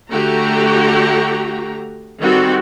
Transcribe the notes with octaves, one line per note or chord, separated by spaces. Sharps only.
D3 A3 F#4 G4 A#5
D#3 G3 C4 F#4 A4